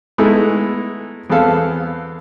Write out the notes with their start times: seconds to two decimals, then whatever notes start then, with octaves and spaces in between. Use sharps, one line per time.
0.18 G#3 A3 B3 D#4 E4 A4
1.30 E2 B3 C4 G#4 A4 F5